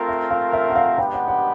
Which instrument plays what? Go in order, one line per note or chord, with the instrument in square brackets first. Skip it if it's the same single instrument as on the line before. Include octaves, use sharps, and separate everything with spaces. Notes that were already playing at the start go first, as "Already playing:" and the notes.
Already playing: [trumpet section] A3 C4 F4 A#4
[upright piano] E5
F5
E5
F#5
F5
[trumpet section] G#3 B3 D4 G4 B4 [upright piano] G5
[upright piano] F#5
F#5